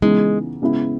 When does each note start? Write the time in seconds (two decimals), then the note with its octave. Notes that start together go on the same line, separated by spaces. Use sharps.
0.02 C#3 E3 G#3 B3 D#4
0.62 C#3 G#3 B3 E4